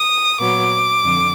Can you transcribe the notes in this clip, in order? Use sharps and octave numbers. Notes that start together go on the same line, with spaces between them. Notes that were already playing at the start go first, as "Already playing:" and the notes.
Already playing: D#6
A#2 F#3 B3 D6
F2 D3